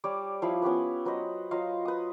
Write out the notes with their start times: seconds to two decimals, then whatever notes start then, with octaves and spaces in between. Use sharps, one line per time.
0.04 G3 C#5 D5
0.42 F3 E4 F5 B5
0.62 B3 C#4 G4 B4
1.05 F#3 B4 C5 D#5
1.51 F#3 F4 D#5 F5
1.85 B4 D#6